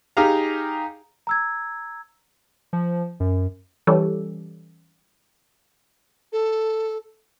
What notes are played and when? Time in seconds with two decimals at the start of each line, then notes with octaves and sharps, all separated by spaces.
0.17 D#4 G4 G#4 F5 A#5
1.27 A#5 E6 G#6
2.73 F3
3.20 F#2
3.87 E3 G3 C#4 G4 A4
6.32 A4